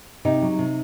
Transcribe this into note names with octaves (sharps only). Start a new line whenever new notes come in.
C3 D#4
F#3
C3